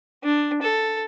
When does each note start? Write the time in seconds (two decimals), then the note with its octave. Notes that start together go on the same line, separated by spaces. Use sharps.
0.24 D4
0.62 A4